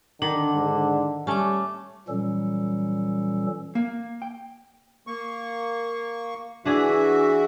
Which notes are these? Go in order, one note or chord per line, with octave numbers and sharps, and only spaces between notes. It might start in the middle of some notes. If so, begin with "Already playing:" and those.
D3 D#3 D4
G#2
G3 A3 C#4 A5 D6
A#2 E3 F#3 G3 C#4 A4
A#3
G5
A#3 C#6
E3 D4 F#4 G#4 E5